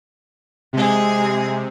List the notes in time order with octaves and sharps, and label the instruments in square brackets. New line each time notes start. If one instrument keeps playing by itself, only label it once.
[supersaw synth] C3 [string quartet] G#3 G#4